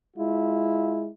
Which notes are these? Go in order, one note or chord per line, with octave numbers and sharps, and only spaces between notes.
G#3 E4 F4